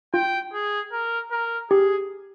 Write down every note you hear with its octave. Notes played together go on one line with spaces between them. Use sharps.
F4 G5
G#4
A#4
A#4
G4 G#4